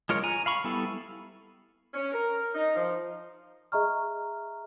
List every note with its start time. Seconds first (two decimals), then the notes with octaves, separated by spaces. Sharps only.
0.09 G#3 F4 A#4 C#5
0.24 G#5 A#5
0.46 F5 B5 C#6
0.64 G3 B3 E4 A4
1.94 C#4
2.12 A#4
2.54 D#4
2.74 F3
3.72 G#4 D#5 E5 A#5 C#6 F6